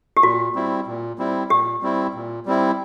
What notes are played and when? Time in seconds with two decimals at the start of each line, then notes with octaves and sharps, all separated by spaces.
0.17 G4
0.23 A#2 F#4
0.55 G3 C4 E4
0.87 A#2
1.18 G3 C4 E4
1.50 A#2 G4
1.82 G3 C4 E4
2.14 A#2
2.46 G3 C4 E4